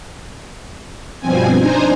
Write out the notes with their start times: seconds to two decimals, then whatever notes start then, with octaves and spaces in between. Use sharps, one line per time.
1.20 G2 B2 F3 C4 G#5
1.59 D4 D#4 C5 G#5 A#5